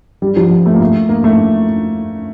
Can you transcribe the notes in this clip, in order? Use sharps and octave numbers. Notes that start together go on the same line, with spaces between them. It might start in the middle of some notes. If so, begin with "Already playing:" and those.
G3
F3
A3
A#3
A3
A#3
A3